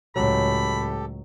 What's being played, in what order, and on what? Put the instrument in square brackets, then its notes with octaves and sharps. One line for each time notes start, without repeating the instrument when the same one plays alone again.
[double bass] C#2 A2 [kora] F#3 [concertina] G4 A4 [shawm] B5